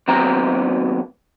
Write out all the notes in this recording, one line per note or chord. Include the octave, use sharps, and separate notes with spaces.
D#2 F#3 B3 C4 E5 A#5